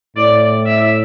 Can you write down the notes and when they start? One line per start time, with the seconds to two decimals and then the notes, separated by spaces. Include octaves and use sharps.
0.16 A2 D5
0.65 E5